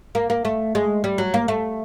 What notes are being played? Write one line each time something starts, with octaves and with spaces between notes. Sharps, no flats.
A#3
A#3
A3
G#3
G3
F#3
A#3
A3